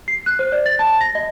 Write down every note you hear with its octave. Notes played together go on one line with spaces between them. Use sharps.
C7
F#6
C5
D5
A6
A5
A#6
D#5